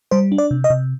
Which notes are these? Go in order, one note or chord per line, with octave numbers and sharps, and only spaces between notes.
G3 C5
D4
D5
C3
D#5
C3